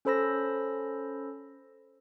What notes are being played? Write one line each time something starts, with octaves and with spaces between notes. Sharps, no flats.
C#4 A4 C5 B5 E6 A#6